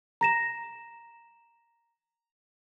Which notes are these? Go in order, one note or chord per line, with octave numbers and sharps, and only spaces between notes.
A#5 A#6 E7